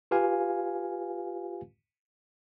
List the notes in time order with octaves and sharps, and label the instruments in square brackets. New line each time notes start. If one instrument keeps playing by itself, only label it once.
[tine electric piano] F4 G4 B4 F5 G#5